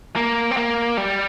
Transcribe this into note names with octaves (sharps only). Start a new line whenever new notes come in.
A#3
C4
A#3
G3